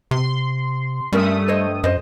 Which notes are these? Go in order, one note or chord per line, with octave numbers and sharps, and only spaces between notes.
C3 C6
G2 G3 A3 C#4 A#4 E5 D#6
C5 C#5 D#5
F#2 C5 D#5